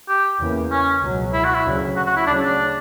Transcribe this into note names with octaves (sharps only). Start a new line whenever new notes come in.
G4
E2 C#3 E3 A#3
C#4
C#2 B2 F#3
E4
F#4
E4
D2 C#3 F#3
F#4
F#4
E4
D2 C#3 F#3 C#4 D4
D4